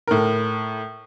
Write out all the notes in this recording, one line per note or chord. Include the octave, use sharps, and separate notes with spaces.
A2 A#4